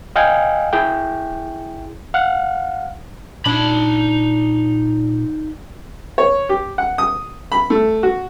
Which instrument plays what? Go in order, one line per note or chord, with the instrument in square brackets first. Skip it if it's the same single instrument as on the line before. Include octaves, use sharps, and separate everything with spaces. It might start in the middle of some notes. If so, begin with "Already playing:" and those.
[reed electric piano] D#5 F5 G5 G#5
E4 G#4 G5
F5 F#5
[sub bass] A#2 [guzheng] D4 [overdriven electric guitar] D#4 B5
[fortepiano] C#5
G4
F#5
D#6
B5
A3
F#4